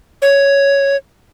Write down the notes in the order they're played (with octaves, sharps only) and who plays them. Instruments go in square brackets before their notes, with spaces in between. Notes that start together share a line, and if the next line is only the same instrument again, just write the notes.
[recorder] C#5